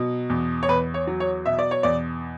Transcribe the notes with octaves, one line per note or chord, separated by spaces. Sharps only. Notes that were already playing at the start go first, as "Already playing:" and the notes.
Already playing: B2 F#3
E2
C#5
E2 B4
C#5
F#3
C#5
B2 E5
D5
C#5
E2 D5